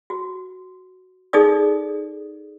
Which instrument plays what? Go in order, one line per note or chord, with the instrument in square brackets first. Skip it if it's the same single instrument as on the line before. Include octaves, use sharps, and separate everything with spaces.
[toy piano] F#4
D#4 G#4 A4 D5 D#6